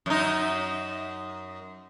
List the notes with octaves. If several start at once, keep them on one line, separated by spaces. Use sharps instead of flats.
F#2 D#4